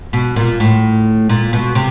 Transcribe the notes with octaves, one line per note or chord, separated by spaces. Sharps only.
B2
A#2
A2
A#2
B2
C3